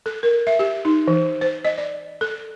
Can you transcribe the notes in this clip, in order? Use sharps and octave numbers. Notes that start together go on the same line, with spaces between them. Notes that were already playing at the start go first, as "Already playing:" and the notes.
A4
A#4
E5
G4
D#4
E3
C5
D#5
D5
A4